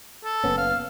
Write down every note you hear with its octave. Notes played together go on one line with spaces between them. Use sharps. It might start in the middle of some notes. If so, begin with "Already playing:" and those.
A4
F#1 B3 C#4
F5